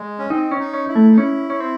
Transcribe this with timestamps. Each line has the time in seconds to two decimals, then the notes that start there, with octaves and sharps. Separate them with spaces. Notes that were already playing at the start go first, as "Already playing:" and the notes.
Already playing: G#3
0.19 C#4
0.30 C4 D#4
0.51 C#4
0.60 D#4
0.73 C#4
0.88 E4
0.95 A3
1.10 D#4
1.17 C#4 E4
1.50 C#4
1.60 C4